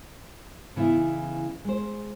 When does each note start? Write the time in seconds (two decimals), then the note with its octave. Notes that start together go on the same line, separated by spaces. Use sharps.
0.76 C#3 E3 B3 D#4 E4
1.65 G#3 C5